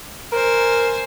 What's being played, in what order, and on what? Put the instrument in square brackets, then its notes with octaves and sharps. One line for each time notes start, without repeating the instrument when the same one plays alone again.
[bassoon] A#4 [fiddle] C5 G#5